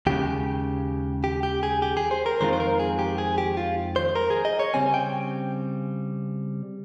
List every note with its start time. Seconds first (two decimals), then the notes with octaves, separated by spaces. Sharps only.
0.07 D#2 C#3 G#3 G4
1.24 G4
1.43 G4
1.63 G#4
1.82 G4
1.97 G#4
2.11 C5
2.26 A#4
2.41 F2 D#3 G#3 C4 F4 C5
2.53 C5
2.60 A#4
2.80 G#4
2.99 G4
3.18 G#4
3.38 G4
3.57 F4
3.96 C5
4.15 A#4
4.30 G#4
4.45 D#5
4.59 C#5
4.74 C#3 G3 C4 G#5
4.94 G5